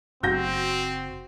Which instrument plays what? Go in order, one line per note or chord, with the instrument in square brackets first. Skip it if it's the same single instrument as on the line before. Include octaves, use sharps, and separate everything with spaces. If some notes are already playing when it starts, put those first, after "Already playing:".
[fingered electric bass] F#1 [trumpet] C4 [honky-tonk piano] F#4 G6 A#6